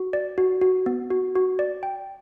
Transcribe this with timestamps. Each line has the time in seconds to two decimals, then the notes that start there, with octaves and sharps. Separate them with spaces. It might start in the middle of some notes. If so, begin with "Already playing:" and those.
Already playing: F#4
0.13 D5
0.38 F#4
0.61 F#4
0.86 B3
1.10 F#4
1.35 F#4
1.59 D5
1.83 G5